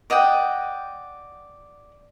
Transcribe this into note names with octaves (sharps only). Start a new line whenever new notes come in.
D5 D#5 F#5 G5